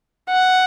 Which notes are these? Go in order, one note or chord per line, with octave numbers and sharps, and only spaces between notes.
F#5